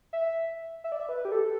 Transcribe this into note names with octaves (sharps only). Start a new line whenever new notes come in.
E5
E5
D5
E5
B4
G4
A4